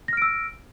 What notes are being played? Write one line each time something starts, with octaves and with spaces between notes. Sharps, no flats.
E6 F6 A#6 D7